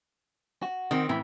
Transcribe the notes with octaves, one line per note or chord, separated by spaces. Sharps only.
F#4
D#3 C4
A2 E3 C4 B5